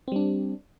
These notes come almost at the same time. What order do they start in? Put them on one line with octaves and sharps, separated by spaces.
C4 G3 D4